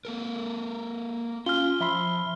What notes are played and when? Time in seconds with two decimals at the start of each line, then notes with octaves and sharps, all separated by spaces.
0.05 A#3 A4 A#4
1.46 C#4 F4 F6 G7
1.81 F3 E5 B5 C6